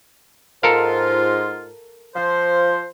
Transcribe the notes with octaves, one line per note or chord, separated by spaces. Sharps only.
G#2 F4 A4 A#4 F5
F3 C5